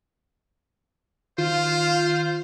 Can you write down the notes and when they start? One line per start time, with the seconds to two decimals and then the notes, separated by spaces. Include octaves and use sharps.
1.38 D#3 F4 C5 F5